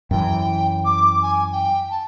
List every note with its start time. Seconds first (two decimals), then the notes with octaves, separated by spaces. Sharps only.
0.11 F#2 E3 G5
0.85 D6
1.22 G#5
1.52 G5
1.90 A5